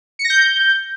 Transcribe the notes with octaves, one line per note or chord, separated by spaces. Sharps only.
C#7
A#6
G6